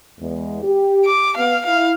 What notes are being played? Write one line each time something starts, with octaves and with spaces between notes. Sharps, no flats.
E2 G#3
G4
D6
B3 F5
E4 F5